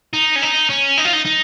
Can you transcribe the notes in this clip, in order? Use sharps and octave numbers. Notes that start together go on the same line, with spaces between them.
D#4
C#4
D#4
C#4
D#4
F4
D#4
D#4